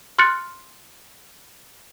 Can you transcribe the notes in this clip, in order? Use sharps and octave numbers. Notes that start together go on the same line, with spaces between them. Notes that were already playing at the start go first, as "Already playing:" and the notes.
C6 F6 F#6 A6 C#7